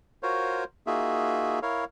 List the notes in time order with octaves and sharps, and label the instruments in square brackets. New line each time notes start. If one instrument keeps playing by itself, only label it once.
[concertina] F4 F#4 A#4 C5 C#5
A#3 D#4 F4 F#4 G#4 E5
E4 A#4 C#5 F5